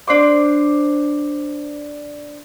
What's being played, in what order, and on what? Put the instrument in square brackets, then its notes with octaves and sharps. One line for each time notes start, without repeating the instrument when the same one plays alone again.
[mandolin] D4 C5 D6